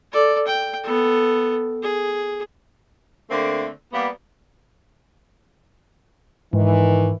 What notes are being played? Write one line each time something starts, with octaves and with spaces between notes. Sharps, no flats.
A4 D5
G5
B3 A4
G#4
D3 A3 A#3 C4
G3 A#3 B3
G#2 D#3 E3